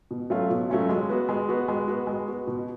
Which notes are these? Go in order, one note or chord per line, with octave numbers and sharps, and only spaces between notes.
B2
F#3 A3 C#4 F4
B2
F#3 A3 C#4 F4
G#3
B3 F#4
G#3
B3 F#4
G#3
B3 F#4
G#3
B3 F#4
B2